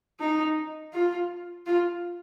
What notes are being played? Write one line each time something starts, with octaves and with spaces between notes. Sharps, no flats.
D#4
F4
F4